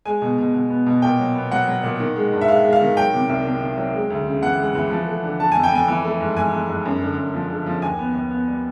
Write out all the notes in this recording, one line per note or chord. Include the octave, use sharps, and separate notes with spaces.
G#3 G#5
B2
B2
B2
B3
B2
A#2 G5
F#3
B3
F#3 F#5
F#3
A#2
D#3
G#3
G2
E5
G#3 F5
G#3
F5
D#3
F#3 G5
C3
C2
C3
D#3
F#3
G#3
D2
C#3
E3 F#5
G#3
E3
F3
A3
D3
D3 A5
F2 G#5
G5
F2 G#5
E3
A3
G#2
G#2 G#5
G#2
G#2
F#2
D3
F#2
F3
D3
F3
D#2 G#5
B3
D#2
B3
G3